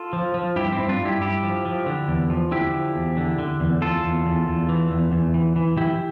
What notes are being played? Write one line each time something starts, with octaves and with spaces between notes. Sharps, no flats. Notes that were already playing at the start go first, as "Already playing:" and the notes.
Already playing: F4 A4
F3
F3
G2 E4 G4
C4 E4
G2
D4 F4
G2
E4 G4
G2 E4 G4
F3
F3
D3
E2
F3
D3 E4 G4
F3
E2
D3
D3
E2
E2 F4 A4
E2
E2
E2
E3
E2
E2
E3
E3
E3 E4 G4